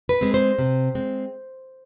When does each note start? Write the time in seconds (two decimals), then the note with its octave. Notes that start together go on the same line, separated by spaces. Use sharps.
0.09 B4
0.21 G#3 C4
0.34 C5
0.59 C3
0.95 G#3 C4